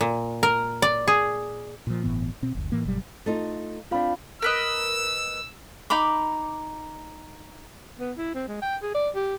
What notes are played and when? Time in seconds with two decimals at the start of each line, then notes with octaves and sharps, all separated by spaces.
0.01 A#2
0.43 A#4
0.82 D5
1.08 G#4
1.87 A#2 F3
2.03 G1 A2 E3 B3
2.42 B2 C4
2.55 F#1 D2
2.72 A2 E3 A#3
2.85 G1 B2 F#3 G3
3.26 A3 D#4 F4
3.91 C4 D4 F4 F5 B5
4.42 A#4 B4 D#5 E6
5.90 D#4 A#5 B5 D6
8.00 B3
8.18 E4
8.35 C4
8.48 G#3
8.62 G5
8.82 G#4
8.95 D5
9.15 G4